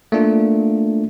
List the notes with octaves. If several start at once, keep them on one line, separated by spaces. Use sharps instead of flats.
A3 A#3 D4 F4